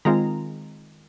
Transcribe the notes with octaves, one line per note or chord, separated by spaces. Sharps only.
D#3 G#3 C4 F4 A#5